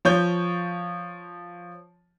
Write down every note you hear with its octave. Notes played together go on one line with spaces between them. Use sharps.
F3 C#5 G6